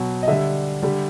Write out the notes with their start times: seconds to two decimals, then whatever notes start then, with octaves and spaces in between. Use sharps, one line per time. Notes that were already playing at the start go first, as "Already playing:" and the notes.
Already playing: B2 F#3
0.23 D#5
0.28 D3 G3 E5
0.82 D3 G3